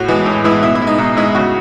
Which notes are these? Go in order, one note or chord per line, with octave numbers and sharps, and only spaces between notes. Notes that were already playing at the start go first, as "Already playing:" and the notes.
Already playing: A2 F#4
E3 G#3
A2
E3 G#3 E4
B2 E4
E4
G#3
D#4
B2 D#4
G#3 E4
C#3 F#4